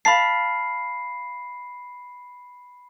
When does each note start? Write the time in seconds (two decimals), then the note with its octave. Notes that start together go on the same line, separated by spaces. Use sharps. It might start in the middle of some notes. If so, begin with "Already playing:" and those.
0.05 F5 A5 B5 B6 C7